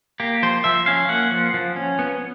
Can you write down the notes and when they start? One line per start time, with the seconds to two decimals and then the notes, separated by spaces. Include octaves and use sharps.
0.20 A#3 G4
0.43 F3 C5
0.64 F3 E5
0.86 C#4 F5
1.09 A#3 F#5
1.31 F3
1.54 F3
1.76 C#4
1.99 B3